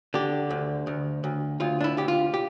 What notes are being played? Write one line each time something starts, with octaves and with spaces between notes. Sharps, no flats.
D3 G4
D2
D2
D2
D2 F4
D4
E4
D2 G4
F4
G4